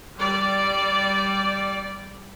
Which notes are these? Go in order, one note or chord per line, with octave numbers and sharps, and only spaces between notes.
G3 D5